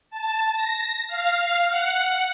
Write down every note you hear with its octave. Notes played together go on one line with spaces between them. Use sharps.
A5
A#6
F5
F#5